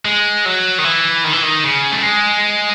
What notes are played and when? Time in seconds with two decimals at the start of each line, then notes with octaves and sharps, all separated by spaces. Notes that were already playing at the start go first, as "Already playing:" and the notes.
0.05 G#3
0.46 F#3
0.79 D#3
0.84 E3
1.24 D#3
1.33 E3
1.43 D#3
1.64 C#3
1.92 A3
2.03 G#3